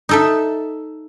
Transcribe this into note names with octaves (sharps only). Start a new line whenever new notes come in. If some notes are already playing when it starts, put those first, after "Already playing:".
D#4 A4 E5